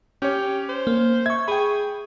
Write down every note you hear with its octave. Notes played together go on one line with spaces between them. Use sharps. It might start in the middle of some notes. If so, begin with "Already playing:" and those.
C#4 G4 C#5
C5
A#3
E5 C#6 G#6
G#4 G5 B5